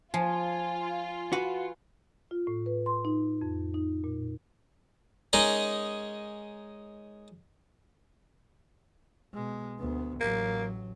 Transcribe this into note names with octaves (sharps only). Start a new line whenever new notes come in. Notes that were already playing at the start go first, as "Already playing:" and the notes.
F3 F4 G#5
F#4 B4
F4
A2
B4
C6
D#4
F2
D#4
A#2
G#3 C#4 D#4 A#4 D#5
B2 G#3
D2 B3
A1 F#3 A#3